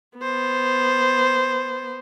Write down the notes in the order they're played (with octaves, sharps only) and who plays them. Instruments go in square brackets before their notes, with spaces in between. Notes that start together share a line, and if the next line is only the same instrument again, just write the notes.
[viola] B3 C5